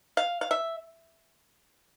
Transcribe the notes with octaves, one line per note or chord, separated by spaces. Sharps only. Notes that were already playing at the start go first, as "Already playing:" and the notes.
F5
F5
E5